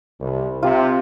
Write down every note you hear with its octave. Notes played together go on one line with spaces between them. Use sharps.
C2
C3 F4